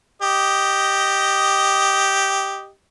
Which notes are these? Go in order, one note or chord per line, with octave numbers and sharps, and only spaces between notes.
G4 D#5